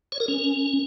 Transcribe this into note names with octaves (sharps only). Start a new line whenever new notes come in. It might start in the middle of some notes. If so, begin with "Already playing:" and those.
C#5
A#4
C#4